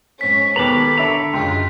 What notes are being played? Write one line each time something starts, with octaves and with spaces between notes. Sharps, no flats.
G#2 C#4 B6
D#2 B2 B3 A4 A#5 B5 D6
D3 D4 C#5 E5 A#5 B5
C#2 F#2 G#3 F4 G5 C6